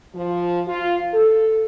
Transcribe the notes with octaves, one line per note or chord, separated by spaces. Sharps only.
F3
F4
A4